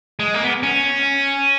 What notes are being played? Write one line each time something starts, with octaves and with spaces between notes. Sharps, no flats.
G#3
A#3
B3
C#4